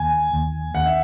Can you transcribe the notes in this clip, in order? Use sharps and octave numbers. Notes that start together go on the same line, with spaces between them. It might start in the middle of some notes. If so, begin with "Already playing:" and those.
Already playing: D#2 G#5
D#2
D#2 F#5
E5